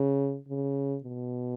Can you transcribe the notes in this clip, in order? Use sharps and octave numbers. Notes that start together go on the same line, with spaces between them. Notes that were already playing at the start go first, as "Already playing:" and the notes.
Already playing: C#3
C#3
B2